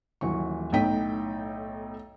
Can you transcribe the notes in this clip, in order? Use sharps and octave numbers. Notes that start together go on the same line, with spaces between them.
D#1 E3 F#3 C#6
B1 A2 D#4 G5 B6